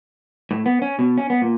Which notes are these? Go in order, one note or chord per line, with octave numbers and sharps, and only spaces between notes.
A2
B3
C#4
B2
C#4
B3
A#2